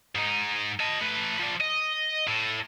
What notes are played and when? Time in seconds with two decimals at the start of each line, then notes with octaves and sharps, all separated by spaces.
0.15 G#2 D#4
0.80 D#5 A5
1.01 A3 B4
1.39 F3 D5
1.61 D#5
2.28 A2